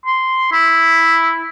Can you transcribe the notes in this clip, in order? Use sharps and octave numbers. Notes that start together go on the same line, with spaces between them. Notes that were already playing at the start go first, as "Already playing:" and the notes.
C6
E4